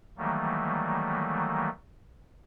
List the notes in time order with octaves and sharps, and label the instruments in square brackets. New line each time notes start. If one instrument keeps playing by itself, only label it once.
[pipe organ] D#3 E3 F#3 G3 A3 A#3